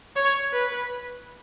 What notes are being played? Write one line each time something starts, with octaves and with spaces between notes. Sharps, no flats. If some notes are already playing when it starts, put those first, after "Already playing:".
C#5
B4